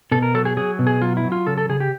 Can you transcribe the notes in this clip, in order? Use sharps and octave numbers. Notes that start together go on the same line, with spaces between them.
B2 A4
A#4
F#3 A4
G#4
F#3 G#4
B2
G#4
F#3 F4
E4
F#3
F4
C#3 A4
A4
C#3 G#4
G4